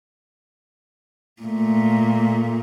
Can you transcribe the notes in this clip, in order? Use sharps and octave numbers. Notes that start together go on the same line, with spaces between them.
A#2 A3